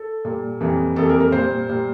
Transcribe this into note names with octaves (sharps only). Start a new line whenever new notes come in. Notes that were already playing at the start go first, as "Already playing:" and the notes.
Already playing: A4
A#2 G3 A#3
F2 E3 G3 A#3
F2 E3 G3 A#3 A4
A#4
A#4
A#2 G3 A#3 C5
A#2 G3 A#3